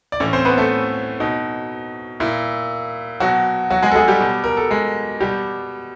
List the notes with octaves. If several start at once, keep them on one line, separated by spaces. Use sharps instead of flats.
D5
A2 E3 C#4 C#5
C4 C5
B3 B4
A3 A4
B2 D#4
A#2 E4
B2 F#3 F#4
F#3 F#4
G#3 G#4
A4
G#3 G#4
G3 G4
B2
A#4
A4
G#3 G#4
B2 G3 G4